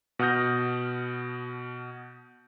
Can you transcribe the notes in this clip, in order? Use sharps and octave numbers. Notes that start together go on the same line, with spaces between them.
B2 F#5 D#6 F6 G6 A#6